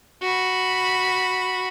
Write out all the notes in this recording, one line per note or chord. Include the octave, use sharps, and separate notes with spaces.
F#4 B5